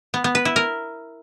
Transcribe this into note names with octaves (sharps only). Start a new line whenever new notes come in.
B3
B3
B4
E4
A#4